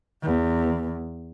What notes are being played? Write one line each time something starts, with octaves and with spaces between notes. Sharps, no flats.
E2